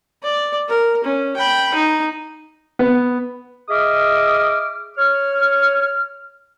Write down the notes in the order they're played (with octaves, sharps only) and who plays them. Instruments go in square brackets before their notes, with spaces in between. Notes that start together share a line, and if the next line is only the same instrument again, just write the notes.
[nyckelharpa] D5
A#4
C#4
G5 B5
D#4
[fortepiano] B3
[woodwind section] G#4 D#5 E5 D6 D#6 F6
C#5 F6